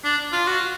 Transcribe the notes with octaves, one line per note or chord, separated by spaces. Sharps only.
D4
F4
F#4